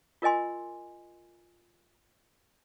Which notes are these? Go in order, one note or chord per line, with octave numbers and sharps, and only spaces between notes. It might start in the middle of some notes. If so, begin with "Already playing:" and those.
F4 A#4 D#5 G#5 C6